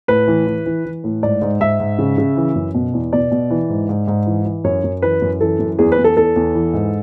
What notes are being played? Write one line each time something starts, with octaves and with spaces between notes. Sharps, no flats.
A2 B4
E3
E3
E3
E3
A2
G#2 D5
G#2
G#2 E5
G#2
C#3
C#3
E3
F#2
B2
E2
B2 D5
B2
E3
G#2
G#2
G#2
E3
E3
F#2 C#5
F#2
E3 B4
F#2
E3 A4
F#2
E2 G#4
B4
E2
A4
E2 A4
E2
E3
G#2